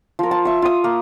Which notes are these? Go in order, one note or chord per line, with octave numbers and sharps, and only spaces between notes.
F3 A#4
A5
E5 C#6
F4 D#6
A#3